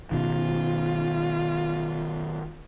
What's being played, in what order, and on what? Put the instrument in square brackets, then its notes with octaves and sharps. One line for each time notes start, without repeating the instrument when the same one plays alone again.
[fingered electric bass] B2 D#3 [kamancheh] F4